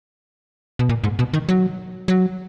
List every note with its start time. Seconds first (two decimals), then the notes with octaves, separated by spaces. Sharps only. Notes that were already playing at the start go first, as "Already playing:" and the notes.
0.79 B2
0.89 A#2
1.04 G#2
1.19 B2
1.34 D#3
1.49 F#3
2.08 F#3